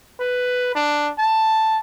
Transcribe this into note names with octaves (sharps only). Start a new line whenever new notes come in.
B4
D4
A5